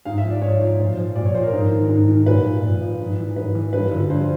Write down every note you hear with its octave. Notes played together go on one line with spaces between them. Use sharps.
G#2 F5
E5
F3
D5
G#2 C#5
F3
A#2 C5
F3
A#2 D5
C#5
F3 C5
A#4
G#2
D#3
G#2
D#3
A#2 B4
F3
A#2
F3
G#2
E3
G#2 B4
E3
G2 B4
D3 F3
G2 C5